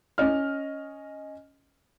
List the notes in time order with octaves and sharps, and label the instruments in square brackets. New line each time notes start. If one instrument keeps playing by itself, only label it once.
[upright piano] C#4 D#5 F6